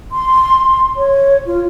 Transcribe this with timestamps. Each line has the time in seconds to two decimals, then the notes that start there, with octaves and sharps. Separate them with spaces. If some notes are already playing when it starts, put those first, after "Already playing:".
0.12 C6
0.96 C#5
1.46 F4